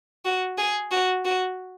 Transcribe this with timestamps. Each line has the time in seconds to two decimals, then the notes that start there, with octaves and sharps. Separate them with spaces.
0.25 F#4
0.58 G#4
0.91 F#4
1.25 F#4